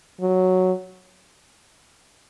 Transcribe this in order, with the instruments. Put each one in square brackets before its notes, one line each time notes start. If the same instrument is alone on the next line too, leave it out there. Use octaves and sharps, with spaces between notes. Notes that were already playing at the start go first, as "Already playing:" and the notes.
[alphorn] F#3